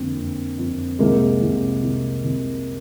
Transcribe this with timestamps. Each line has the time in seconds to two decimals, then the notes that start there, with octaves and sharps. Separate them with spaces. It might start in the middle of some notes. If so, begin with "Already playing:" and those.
Already playing: F2 D3 A#3 C4
0.16 F2
0.58 F2
0.99 C2 G#3 A#3
1.41 C2
1.82 C2
2.23 C2